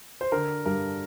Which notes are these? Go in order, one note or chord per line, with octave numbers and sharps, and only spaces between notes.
C5
D3 A#4
G2 A#4